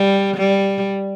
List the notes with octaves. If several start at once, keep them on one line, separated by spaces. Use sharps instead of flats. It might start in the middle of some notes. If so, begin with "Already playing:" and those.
Already playing: G3
G3